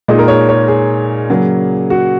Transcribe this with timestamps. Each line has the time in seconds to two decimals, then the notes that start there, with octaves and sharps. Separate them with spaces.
0.08 A#2 G#3 D#4 D#5
0.19 A#4
0.28 C#5
0.49 C#5
0.68 G#4
1.30 C#3 F#3 A#3
1.90 F#4